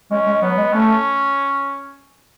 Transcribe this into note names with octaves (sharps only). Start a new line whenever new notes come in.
G#3 C#4
G#3
F#3 B3
G#3
A3 C#4